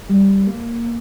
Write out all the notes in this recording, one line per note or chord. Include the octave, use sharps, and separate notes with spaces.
G3
A#3